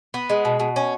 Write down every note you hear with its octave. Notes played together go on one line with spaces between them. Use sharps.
B3
G#3
B2
B2
C#4